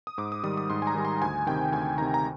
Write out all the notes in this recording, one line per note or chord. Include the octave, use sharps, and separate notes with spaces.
D#6
G#2 D6
D#6
D#3 G3 D#6
D#6
G#2 C6
G#5
A#5
D#3 G3
C6
D2 G#5
C3 D#3 G5
D2 G#5
C3 D#3 A#5
A#5